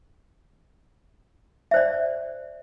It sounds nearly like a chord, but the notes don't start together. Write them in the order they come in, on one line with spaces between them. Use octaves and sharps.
E5 C5 D5